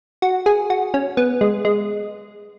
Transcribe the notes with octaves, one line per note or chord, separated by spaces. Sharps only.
F#4
G#4
F#4
C#4
B3
G#3
G#3